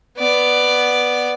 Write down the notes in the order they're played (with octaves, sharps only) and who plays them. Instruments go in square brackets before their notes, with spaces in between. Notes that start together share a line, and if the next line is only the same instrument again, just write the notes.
[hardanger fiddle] B3 D5